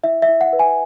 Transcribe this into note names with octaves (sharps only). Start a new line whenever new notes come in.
E4 E5
E5
E4
F#5
B4
G#5